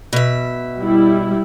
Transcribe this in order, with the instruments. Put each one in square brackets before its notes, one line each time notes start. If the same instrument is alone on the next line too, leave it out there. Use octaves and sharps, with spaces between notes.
[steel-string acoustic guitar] B2 E5
[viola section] G3 E4